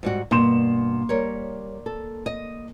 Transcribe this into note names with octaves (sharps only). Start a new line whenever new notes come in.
G#2 G3 F#4
G2 B2 A#3 C6 E7
G3 A#4 C#5
A4
D#5